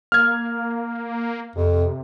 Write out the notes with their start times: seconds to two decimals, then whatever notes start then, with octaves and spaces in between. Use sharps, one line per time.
0.12 A#3 F6 G#6
1.55 F2 C3